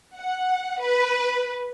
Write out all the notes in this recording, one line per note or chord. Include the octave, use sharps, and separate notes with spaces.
F#5
B4